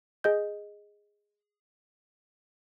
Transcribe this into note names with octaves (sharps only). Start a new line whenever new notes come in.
G#4 D#5 G6